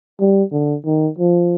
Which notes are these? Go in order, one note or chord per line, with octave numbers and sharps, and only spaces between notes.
G3
D3
D#3
F3